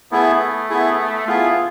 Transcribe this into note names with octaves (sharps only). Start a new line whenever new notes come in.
A3 B3 E4 G#4
B3 E4 G#4
B3 E4 F4 G#4